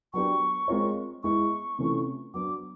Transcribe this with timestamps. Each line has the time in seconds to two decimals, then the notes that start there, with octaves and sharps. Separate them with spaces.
0.13 F#3 B3 D4 G4 C#6
0.68 G#3 C4 F4 A#4 C#5
1.23 G#3 B3 E4 C#6
1.79 C3 E3 A3 C#4 F4
2.34 F#3 B3 D4 D6